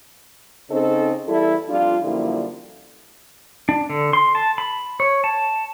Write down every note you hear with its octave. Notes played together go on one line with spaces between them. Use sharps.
C#3 C4 D#4 A4 C5 D#5
E2 G3 E4 A4
F2 G3 D4 F4
F#2 D3 F3 G3 A#3 E4
D4
D3
C6
A5
B5
C#5
A5